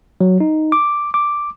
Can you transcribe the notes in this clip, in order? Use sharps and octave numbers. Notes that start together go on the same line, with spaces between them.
F#3
D#4
D6
D6